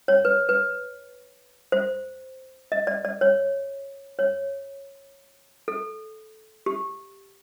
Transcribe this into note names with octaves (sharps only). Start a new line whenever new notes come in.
C#5
B4
B4
C5
D#5
D5
D5
C#5
C#5
A4
G4